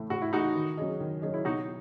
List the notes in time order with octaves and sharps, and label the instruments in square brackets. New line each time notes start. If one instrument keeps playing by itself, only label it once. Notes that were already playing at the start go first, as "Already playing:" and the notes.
Already playing: [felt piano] A2 E3 A3
[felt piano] A2 [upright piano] F#4
[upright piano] E4
[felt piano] E3 A3 [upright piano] D#4 F#4
[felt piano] D#3
F#3 C#4 G#4 D#5
D#3
F#3 C#4 G#4 D#5
[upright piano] E4
[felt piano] B2 [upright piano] D#4 F#4